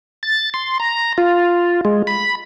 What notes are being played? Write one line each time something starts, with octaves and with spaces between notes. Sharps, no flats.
A6
C6
A#5
F4
G#3
B5